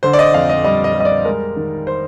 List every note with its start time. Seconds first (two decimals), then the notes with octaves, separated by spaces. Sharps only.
0.03 D3 C5
0.13 D5
0.19 D#5
0.34 F2 F5
0.49 D#5
0.64 G3 D#5
0.84 D#5
0.94 G3
1.00 D#5
1.05 D5
1.25 G#3 A#4
1.56 D#3
1.87 C5